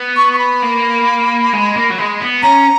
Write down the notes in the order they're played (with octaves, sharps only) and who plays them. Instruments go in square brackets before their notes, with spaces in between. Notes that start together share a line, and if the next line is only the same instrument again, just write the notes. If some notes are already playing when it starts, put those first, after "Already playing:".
Already playing: [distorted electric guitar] B3
[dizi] C#6
C#6
B5
[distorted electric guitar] A#3
G#3
A#3
F#3
G#3
B3
[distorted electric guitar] C#4 [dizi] A#5